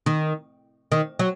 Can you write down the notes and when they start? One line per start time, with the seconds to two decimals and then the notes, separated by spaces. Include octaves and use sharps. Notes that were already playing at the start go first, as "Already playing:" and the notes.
0.06 D#3
0.92 D#3
1.19 F#3